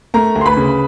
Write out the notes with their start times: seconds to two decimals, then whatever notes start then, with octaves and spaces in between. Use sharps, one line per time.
0.14 A3 A#4 A#5
0.35 D2
0.41 C6
0.46 B4 B5
0.57 C#3